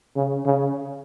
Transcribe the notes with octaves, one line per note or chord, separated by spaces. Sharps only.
C#3
C#3